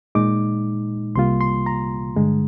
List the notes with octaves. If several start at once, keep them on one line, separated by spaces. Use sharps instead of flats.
A#2 G#3 D#4 D6
C2 C3 G3 A#3 F4 C6
C6
A#5
G2 D3 G#3